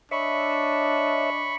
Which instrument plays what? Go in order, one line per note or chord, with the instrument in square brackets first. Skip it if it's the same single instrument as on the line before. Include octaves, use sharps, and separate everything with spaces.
[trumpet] D4 [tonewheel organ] C#5 D#5 E5 [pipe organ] B5 C#6